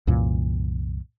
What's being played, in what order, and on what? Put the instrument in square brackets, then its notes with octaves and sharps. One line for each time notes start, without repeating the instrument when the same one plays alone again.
[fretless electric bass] C2 F#2 A#2 E3